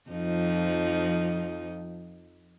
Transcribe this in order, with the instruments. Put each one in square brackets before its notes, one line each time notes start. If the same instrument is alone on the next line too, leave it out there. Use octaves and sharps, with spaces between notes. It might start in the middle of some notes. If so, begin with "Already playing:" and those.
[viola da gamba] F2 F3 D#4